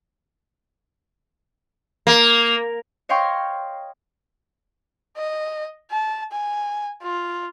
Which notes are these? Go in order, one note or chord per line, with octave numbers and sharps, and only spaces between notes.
A#3
C#5 D#5 F5 G5 C6 C#6
D#5
A5
G#5
F4